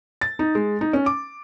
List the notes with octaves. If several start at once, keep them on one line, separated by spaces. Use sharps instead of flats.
A6
D#4
G#3
D#4
C#4
D6